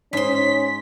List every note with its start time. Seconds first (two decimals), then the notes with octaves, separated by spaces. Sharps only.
0.13 G#2 C#4 C6 B6